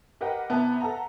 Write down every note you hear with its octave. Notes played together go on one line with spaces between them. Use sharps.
G4 A#4 B4 D#5 F#5 G5
C3 B3 E4 A5
A4 B4 E5 F#5 A5 A#5